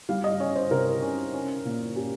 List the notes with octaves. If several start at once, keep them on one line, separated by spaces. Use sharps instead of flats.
G3 F5
D#5
C#4 C#5
C5
C3 A#4
C#4
C#4
A#2
C#4 G4